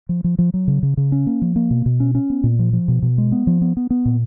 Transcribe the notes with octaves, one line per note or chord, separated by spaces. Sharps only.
F3
F3
F3
F#3
C#3
C#3
C#3
C#4
A#3
F3
A#3
B2
B2
C#4
C#4
B3
A#2
F3
F3
B2
B2
G#3
B3
F3
B3
B3
B3
A#2